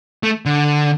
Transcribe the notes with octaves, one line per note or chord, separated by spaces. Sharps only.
A3
D3